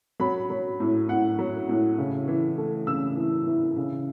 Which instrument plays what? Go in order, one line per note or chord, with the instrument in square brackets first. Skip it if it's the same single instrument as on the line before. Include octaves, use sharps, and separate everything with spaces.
[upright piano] F#3 B5
F#3
A2
A2 F#5
F#3
A2
C#3
E3
A3
C#3 E6
E3
E3
C#3